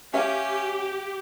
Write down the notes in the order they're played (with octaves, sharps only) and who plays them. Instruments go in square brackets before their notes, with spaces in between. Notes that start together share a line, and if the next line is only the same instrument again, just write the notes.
[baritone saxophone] C#4 [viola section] G4 [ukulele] E5 F5 G#5